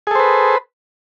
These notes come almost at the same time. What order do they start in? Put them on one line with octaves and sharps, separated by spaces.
G#4 A4 C5 B4